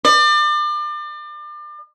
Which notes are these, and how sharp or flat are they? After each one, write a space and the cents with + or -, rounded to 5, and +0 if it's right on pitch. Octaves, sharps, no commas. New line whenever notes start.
D5 +35